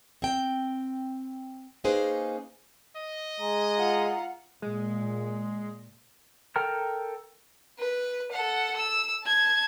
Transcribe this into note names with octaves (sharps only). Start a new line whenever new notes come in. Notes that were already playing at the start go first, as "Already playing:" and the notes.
C4 G5
A#3 C#4 D#4 G#4 B4 C5
D#5
G#3 A#5
F4 F#5
A#2 G#3
A4 A#4 G5 A#5 F6
B4
A4 F#5
E6
A5 G#6